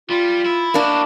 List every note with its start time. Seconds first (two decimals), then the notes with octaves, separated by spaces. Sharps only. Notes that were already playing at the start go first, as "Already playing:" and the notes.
0.10 G3 F4
0.46 E4
0.74 A#3 D4 E4 F#4